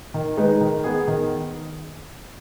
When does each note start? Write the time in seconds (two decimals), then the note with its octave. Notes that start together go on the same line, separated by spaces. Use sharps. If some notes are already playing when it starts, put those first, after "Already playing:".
0.14 D#3
0.37 G#3 D#4 B4
0.61 D#3
0.84 B3 G#4
1.08 D#3